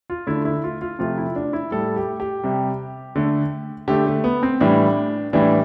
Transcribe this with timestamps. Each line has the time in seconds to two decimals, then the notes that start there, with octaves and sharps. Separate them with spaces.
0.10 F4
0.27 D3 A3 E4
0.45 E4
0.64 F4
0.81 F4
0.99 C3 F3 A3 F4
1.18 E4
1.36 D4
1.53 E4
1.71 A2 G3 A4
1.96 G4
2.20 G4
2.44 C3 G3
3.16 D3 A3
3.88 D3 A3 G4
4.07 A3
4.24 B3
4.43 C4
4.60 A2 E3 G3 D4
5.33 A2 E3 G3 D4